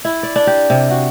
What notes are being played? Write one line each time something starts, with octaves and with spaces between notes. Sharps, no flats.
E4
D5
D4
G4
C3
F#4